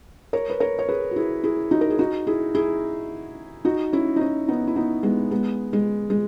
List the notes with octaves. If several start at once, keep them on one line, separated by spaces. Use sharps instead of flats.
A#4 C#5
B4
A#4 C#5
C#5
G#4 B4
F#4
E4 G#4
E4 G#4
D#4 F#4
A#4
G#4
D#4 F#4
E4 G#4
E4 G#4
D#4 F#4
C#4 E4
D#4
C#4 E4
B3 D#4
E4
B3 D#4
G#3 B3
G#3 B3
G#3
G#3